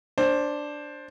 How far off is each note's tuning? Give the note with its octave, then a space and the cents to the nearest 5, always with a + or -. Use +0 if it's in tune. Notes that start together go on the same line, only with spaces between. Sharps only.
D4 +0 C5 +15